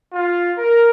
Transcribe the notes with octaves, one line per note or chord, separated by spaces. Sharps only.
F4
A#4